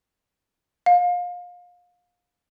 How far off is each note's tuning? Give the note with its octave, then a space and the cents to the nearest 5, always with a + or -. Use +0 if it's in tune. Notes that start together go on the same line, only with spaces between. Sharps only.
F5 +30